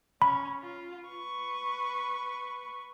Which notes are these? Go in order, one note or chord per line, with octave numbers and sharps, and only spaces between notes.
C#4 B5
F4
B4 C#6